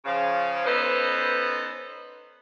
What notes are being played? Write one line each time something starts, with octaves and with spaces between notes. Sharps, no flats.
C#3 F3 F5
B3 C#4 D#4 A4 B4 C5